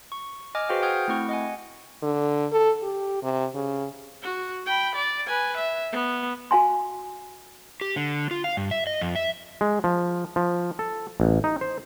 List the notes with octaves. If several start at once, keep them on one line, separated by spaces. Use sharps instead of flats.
C#6
D#5 G#5 D6 F6
F#4 G#4 B4 C5 F5 G5
F#5 G5 D#6 F6 G6 G#6
A3 C4 E4 F#5 C#6
D#5 F#5 G#5
D3
A4
G4
C3
C#3
F#4
G5 B5
D5
B4 G#5
E5
B3
F#4 F5 G#5 C6
G4
D3
F4
F5
G2
E5
D#5
F2
E5
G#3
F3
F3
A4
A1
D#4
C5